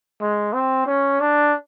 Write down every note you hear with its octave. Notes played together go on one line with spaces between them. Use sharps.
G#3
C4
C#4
D4